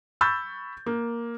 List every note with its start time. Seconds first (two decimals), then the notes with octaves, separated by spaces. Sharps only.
0.21 B5 C#6 E6 G6 A6
0.86 A#3